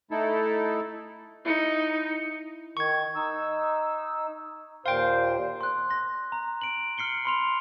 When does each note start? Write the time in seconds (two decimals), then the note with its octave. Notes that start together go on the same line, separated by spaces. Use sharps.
0.11 A3 D#4 E4 A4
1.45 D#4 E4 C#7
2.77 D#3 C#6 G#6
3.16 D#4 E6
4.86 D#2 A#2 C5 F5 G5
5.61 C6 F#6
5.90 C6 A#6
6.32 A#5
6.61 D7 F#7
6.98 F6 C7 C#7 G7
7.25 B5 C6 F7